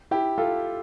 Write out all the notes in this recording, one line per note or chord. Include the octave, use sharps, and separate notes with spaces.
E4 G4
F4 A4